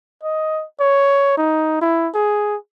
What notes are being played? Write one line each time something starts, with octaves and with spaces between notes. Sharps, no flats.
D#5
C#5
D#4
E4
G#4